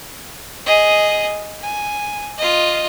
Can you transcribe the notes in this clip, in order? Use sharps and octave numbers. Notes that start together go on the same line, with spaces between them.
G#4 D#5
G#5
F4 D#5